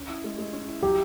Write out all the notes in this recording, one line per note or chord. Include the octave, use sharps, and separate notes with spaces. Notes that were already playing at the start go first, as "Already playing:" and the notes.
Already playing: C#4
E4
G#3
G#3
C#4
E4
F#3 G4